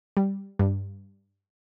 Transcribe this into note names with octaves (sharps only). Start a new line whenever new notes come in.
G3
G2